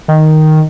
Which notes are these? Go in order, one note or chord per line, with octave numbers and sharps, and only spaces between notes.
D#3